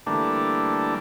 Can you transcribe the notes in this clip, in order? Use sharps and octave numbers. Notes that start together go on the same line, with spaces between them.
D3 E3 G3 A3 A#3 D4